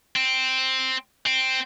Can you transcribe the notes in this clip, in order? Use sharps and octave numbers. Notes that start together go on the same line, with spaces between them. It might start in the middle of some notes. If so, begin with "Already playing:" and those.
C4
C4